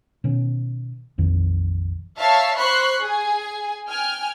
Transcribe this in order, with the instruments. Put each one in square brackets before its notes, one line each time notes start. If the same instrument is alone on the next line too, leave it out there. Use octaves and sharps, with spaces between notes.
[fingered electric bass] B2 D#3 B3 C#4
A#1 F2 D#3
[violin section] C#5 E5 F5 A5
C5 B5 C#6 F#6 C7
G#4 G#5
G5 G#5 F6